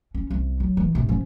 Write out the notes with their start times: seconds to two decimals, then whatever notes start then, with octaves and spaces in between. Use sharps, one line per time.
0.15 C#4
0.31 C2
0.60 F#3
0.77 E3 D#4
0.95 G#2 C3
1.09 F3 C#4